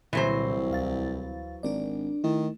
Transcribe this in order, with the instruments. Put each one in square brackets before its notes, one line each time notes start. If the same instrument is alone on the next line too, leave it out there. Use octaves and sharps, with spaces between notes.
[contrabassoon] C2 [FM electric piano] A#2 D3 [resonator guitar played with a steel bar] E3 F#3 C5
[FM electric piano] D2 F5 A6
[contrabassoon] G#1 [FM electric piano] D4 A#4 D5
[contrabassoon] D#3 [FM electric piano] A3 E4